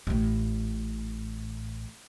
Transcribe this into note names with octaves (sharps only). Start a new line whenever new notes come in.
A1 A2